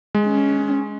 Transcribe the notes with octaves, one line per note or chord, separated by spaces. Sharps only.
G#3
C#4